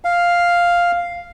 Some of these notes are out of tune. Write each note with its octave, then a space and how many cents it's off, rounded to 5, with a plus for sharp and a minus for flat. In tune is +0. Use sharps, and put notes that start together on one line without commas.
F5 +0